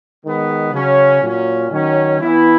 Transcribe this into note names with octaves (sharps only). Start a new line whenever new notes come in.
D#3 G#3 B3
C#3 F#3 C#4
A#2 F#3 C#4
D#3 F#3 C#4
E3 B3 E4